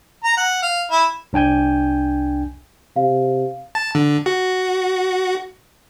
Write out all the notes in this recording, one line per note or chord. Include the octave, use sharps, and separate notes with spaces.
A#5
F#5
F5
E4
C2 D4 G5 G#5 G6
C3 F5
A5
D3
F#4